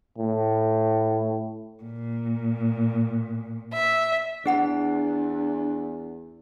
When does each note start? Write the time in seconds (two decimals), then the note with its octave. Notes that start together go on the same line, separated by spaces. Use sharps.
0.19 A2
1.83 A#2
3.74 E5
4.46 E2 D4 G#4 F#5 B5